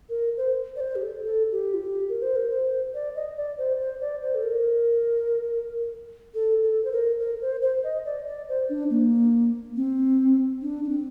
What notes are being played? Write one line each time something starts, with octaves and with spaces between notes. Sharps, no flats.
A#4
C5
D5
C5
G4
A4
A4
G4
F4
G4
A#4
C5
A#4
C5
D5
D#5
D5
C5
C5
D5
C5
A4
A#4
A4
A4
C5
A#4
A#4
C5
C5
D#5
D5
D5
C5
D4
A#3
C4
D4
D4
C4